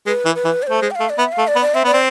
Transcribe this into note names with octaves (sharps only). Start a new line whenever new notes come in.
G#3 B4
E3
B4
E3
D5
A3 C5
G#3
G5
A3 F5
D5
B3 E5
F5
A3
D5
B3
D5
C4 E5
B3 D5
C4